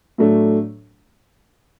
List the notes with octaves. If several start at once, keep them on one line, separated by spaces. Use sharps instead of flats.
A2 F#3 A3 D4